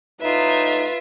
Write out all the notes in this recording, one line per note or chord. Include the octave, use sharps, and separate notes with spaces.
A2 D#4 F4 B4 E5